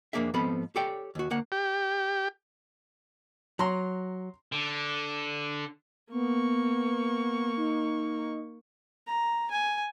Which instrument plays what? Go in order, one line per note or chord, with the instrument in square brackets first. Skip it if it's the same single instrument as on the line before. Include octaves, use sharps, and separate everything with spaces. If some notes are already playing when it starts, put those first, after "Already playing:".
[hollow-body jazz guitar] F2 G#2 A#3 D4 G#4 E5
G#2 F3 B3 C4 A4 B5
G4 A4 C#5 D5 G5
D#2 F#4
D2 A#3 F#5
[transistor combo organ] G4
[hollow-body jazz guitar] F#3 [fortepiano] A#5 C6
[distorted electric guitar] D3
[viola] A#3 C#6 [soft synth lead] B3
[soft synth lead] D#4
[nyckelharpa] A#5
G#5